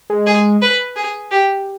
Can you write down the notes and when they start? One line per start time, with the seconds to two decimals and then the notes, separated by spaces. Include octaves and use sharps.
0.10 G#3
0.26 G#4
0.62 B4
0.96 G#4
1.31 G4